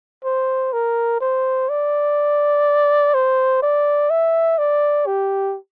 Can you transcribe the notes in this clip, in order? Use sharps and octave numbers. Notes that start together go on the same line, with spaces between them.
C5
A#4
C5
D5
C5
D5
E5
D5
G4